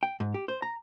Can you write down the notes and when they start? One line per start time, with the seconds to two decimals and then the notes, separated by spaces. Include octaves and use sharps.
0.03 G5
0.20 G#2
0.34 G4
0.48 C5
0.62 A#5